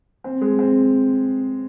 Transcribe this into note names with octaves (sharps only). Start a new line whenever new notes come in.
C4
G#3
C4